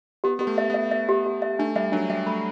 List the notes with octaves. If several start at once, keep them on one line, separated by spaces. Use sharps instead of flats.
B3 G4
B3 G4
A3
E5
B3 E5
E5
G4
G4
E5
A3 D4
G3 E5
F#3 D4
G3 E5
A3 B5